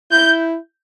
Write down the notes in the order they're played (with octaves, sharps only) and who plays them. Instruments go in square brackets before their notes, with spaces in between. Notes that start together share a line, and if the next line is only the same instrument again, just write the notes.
[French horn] E4 [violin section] G6